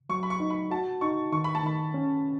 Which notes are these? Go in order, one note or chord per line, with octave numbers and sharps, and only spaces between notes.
F#3 C#6
B5
C#6
D#4
B5
F#4 A5
D#4 C#6
D#3 C#6
B5
A5
D#3 B5
C#4